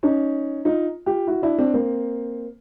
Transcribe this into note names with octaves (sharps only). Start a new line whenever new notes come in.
C#4 D#4
D#4 F4
F4 G4
E4 F#4
D4 E4
C4 D4
A#3 C4